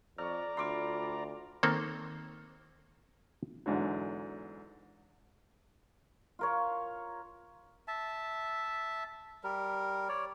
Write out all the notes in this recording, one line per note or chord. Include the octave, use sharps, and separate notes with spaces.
F2 D5 A#5 C#6 F6
D2 F4 B5 C6 D6
D#3 A#3 C4 A4
E2 G#2 D3 F#3
F4 A#4 C#5
E5 A5
G3 A#4
C#5 D5